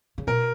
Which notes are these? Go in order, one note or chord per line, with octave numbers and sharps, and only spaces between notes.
C#3
B2 A#4